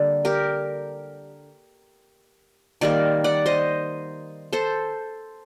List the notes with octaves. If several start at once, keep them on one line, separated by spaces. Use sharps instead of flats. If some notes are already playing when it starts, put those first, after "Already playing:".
Already playing: D3 G3 A#3
G4 A#4
D#3 G3 A#3 A#4 D5
D5 F#5
C5 D#5
A4 C5